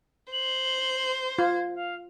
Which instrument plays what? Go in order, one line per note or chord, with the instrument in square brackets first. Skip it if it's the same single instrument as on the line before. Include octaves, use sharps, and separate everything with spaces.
[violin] C5 [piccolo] F#7
[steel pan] F4 [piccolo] G#6
[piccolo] F5